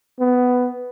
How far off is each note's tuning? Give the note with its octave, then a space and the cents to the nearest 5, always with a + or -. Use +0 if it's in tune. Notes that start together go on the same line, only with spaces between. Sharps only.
B3 +10